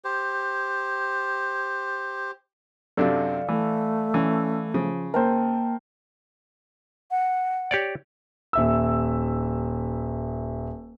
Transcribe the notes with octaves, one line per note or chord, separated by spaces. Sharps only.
G4 C5
F#2 C3 D4 A4 D5 F5
E3 A3
E3 C#4
C#3 F3
A#3 A#4 C5 G5 A5
F#5
G4 C#5 D5
D#1 E5 E6